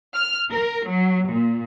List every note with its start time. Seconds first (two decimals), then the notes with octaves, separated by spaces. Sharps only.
0.14 F6
0.51 A#4
0.87 F#3
1.29 A#2